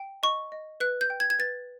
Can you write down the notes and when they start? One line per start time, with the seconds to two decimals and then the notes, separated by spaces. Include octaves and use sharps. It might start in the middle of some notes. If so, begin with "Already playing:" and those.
Already playing: G5
0.23 D#5 C#6
0.52 D#5
0.80 B4 F#6
1.01 G6
1.10 G5
1.20 G#6
1.30 G#6
1.39 B4 A6